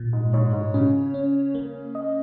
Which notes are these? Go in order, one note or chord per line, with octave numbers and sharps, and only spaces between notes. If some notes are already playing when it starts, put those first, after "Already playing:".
Already playing: A#2
G#2
G#2 C#5
G#2
C#3 C#4
C#4
A#3
D#5